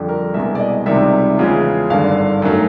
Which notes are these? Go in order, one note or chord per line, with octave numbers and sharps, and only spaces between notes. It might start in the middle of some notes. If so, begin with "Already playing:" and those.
Already playing: F2 D3 G3
A#4
C2 B2 G#3 E5
D5
D#5
C#2 C3 D#3 G3 E5
E2 C#3 F3 G#3
G#1 G2 D3 F5
F#2 D#3 F#3 A3